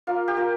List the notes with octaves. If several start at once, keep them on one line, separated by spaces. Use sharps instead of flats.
A#3 F4 F5
G4
A#3 F4 A#4